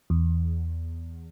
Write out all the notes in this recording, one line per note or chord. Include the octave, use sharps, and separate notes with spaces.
E2